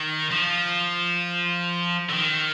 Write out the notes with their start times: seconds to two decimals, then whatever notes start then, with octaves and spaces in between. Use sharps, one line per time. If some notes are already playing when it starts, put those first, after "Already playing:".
Already playing: D#3
0.31 F3
2.09 D3
2.13 D#3